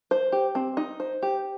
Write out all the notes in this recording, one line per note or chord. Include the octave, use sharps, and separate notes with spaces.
C5
G4
C4
D#4
C5
G4